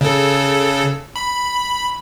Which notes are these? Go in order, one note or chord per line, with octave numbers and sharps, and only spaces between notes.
C#3 A4
B5